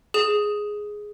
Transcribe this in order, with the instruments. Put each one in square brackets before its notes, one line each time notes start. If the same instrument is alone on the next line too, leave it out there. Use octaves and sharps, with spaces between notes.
[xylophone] G#4 E7